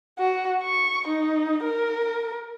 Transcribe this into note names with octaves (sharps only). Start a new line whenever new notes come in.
F#4
C#6
D#4
A#4